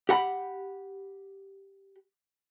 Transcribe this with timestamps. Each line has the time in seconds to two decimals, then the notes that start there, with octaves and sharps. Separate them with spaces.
0.09 G4 F#5 A#5 B5